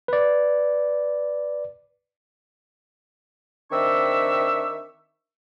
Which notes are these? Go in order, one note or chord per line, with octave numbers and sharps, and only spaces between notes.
B4 D5
D#3 C4 D4 E5 C#6 E6